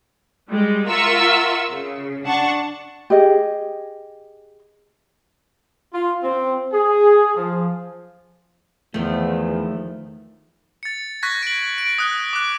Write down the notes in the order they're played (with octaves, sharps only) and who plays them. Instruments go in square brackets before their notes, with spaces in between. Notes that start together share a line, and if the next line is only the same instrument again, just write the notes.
[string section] G3 G#3
F4 A#4 E5 F#5 C#6 E6
C#3
D4 F#5 A5 C#6
[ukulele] G4 G#4 D#5
[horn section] F4
C4
G#4
F3
[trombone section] E2 [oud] D#3 F3 [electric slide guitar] A3
[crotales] A6 C#7
C#6 F#6 G#6 A#6 B6
D7 F#7
D7
D#6 F#6 G7
D6 F#6